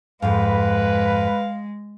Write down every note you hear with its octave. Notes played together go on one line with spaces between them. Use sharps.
F2 G#2 G#3 B4 F5